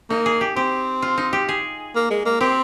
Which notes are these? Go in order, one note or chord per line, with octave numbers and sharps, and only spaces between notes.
A#3 D#4
G#4
G4
C4 G4
F4
D#4
G4
G#4
A#3
G#3
A#3
C4 G4